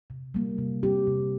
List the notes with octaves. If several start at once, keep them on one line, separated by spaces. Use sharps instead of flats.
C3
G3 A#3
C3
G3 C4 G4
C3